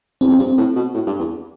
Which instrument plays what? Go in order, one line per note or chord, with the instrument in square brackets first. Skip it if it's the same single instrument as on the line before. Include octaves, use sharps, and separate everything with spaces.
[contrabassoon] E2 [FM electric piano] C4
[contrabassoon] F2
[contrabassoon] G2 [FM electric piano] C4
[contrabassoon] A2
B2
A2
G2
E2